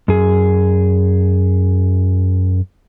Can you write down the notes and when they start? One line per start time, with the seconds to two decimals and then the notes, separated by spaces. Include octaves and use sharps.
0.08 F#2 G#4